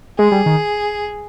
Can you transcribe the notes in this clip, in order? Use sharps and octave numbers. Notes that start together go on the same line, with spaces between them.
G#3 G#4
G3
D#3